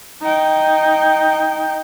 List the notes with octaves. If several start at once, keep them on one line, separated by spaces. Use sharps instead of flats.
D#4 G5